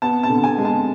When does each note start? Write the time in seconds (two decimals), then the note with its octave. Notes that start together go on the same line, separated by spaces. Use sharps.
0.02 B3 A5
0.23 A5
0.30 D3
0.44 G#5
0.58 G#3
0.65 A5